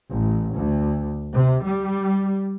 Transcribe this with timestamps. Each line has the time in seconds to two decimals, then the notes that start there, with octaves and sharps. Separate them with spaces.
0.10 A1
0.55 D2
1.33 C3
1.63 G3